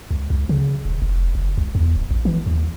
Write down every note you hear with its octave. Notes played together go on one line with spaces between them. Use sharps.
C#2
C#2
C#3
D#1
F1
F#1
C#2
E2
D1
A1
E3
D#2